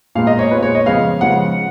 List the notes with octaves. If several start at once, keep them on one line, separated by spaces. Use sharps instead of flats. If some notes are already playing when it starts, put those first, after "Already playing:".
A#2 G#3 B3 F5
D#5
C#5
A#2 G#3 B3 B4
C#5
D#5
C#3 F3 G#3 B3 F5
C#3 F3 G#3 B3 F#5